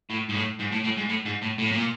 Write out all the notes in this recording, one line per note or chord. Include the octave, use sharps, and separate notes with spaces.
A2
G#2
A2
G#2
A2
A2
G#2
A2
G#2
A2
A2
A#2